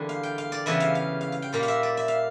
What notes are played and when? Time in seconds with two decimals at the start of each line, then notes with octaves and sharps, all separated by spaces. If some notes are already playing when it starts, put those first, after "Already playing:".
Already playing: E2 D3 G3 A#3
0.09 F5
0.23 G5
0.38 F5
0.52 D5
0.66 E2 C#3 E3 G3 E5
0.80 F5
0.95 F5
1.21 F5
1.32 F5
1.42 G5
1.53 A#2 G3 A#3 F5
1.63 F5
1.68 E5
1.83 D5
1.97 E5
2.08 F5